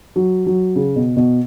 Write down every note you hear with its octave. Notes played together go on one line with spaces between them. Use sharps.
F#3
F#3
C#3
B2
B2